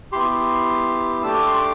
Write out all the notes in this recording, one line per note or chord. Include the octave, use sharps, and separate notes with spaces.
B3 E4 G4 C6
A3 D4 G4 E6
D6
C6
D6